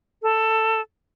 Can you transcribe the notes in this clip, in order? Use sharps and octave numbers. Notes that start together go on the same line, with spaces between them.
A4